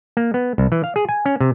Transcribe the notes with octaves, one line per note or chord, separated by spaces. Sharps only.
A#3
B3
C2
E3
F5
G#4
G#5
C#4
C3